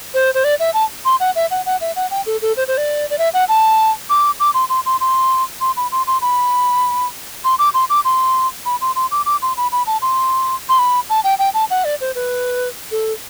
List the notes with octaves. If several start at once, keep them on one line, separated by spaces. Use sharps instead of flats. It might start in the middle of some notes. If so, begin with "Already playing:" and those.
C5
C5
D5
E5
A5
C6
F#5
E5
F#5
F#5
E5
F#5
G5
A4
A4
C5
C5
D5
D5
E5
F#5
A5
D6
D6
C6
C6
C6
C6
C6
B5
C6
C6
B5
C6
D6
C6
D6
C6
B5
C6
C6
D6
D6
C6
B5
B5
A5
C6
C6
B5
A5
G5
G5
A5
F#5
D5
C5
B4
A4